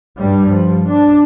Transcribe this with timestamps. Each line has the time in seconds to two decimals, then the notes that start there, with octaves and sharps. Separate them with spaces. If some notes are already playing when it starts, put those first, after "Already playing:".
0.18 G2 G3
0.50 F3
0.88 D4